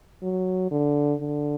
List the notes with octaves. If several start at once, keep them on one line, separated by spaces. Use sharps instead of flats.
F#3
D3
D3